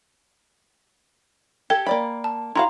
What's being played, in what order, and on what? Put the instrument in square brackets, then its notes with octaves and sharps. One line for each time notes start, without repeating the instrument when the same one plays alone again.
[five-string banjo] G4 A4 [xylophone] G#6
[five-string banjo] A#3 D5 B5 [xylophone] G5
[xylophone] A5
[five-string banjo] E4 F#4 F5 [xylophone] G5 A#5 C6